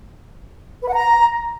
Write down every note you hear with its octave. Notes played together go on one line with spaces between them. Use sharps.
B4
F#5
A#5